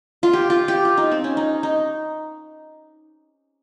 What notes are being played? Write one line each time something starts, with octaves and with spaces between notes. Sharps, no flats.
F4
G4
F4
G4
F4
D#4
C4
C#4
D#4
D#4